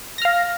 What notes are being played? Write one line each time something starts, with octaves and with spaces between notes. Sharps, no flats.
F5 F6 A#6